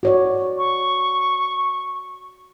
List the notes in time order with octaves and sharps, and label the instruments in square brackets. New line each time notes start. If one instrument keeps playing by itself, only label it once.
[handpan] F#4 C#5 D5
[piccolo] C#6